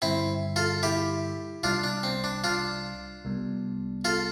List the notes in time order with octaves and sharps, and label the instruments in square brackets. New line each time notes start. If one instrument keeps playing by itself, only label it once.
[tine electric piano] G2 D3 G3 [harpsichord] C4 E4
[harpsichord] F4 A4
E4 G4
[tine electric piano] C2 C3 G3 [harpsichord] D4 F4
[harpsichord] D4
C4
D4
D4 F4
[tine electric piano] C2 C3 G3 B3
[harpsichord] F4 A4